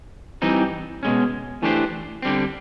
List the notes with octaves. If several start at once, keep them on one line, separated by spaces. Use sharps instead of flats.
E3 G3 C4 D#4
B2 G#3 C#4
E3 A3 D4 G4 C5
D3 G3 C4